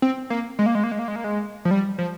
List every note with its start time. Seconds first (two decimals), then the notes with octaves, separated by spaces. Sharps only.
0.02 C4
0.30 A#3
0.59 G#3
0.66 A#3
0.75 G#3
0.84 A#3
0.92 G#3
0.99 A#3
1.08 G#3
1.16 A#3
1.24 G#3
1.65 F3
1.71 G3
1.98 F3